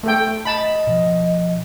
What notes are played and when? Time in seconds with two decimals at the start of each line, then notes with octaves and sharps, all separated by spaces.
0.03 A3 A4 G5
0.45 D#5 A5 B5
0.87 B2 F3